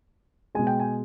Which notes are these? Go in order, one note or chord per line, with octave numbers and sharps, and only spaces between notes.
B2 G#3 G#5
G5
G#5